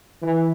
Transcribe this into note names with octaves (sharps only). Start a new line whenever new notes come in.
E3